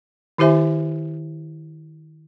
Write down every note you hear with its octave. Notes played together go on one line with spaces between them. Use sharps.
D#3 E4 G4 C5 E5 G#5